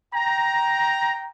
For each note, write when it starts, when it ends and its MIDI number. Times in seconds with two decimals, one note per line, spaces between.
0.14 1.29 79
0.14 1.29 82